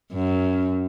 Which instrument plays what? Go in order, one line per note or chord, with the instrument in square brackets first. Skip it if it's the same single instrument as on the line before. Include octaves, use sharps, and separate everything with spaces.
[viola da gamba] F#2